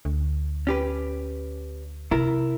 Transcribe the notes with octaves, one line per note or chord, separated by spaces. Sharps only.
D2
C#4 G4 B4
C3 E4 A#4